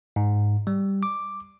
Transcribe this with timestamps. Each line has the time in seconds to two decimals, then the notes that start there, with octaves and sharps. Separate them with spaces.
0.16 G#2
0.67 G3
1.03 D6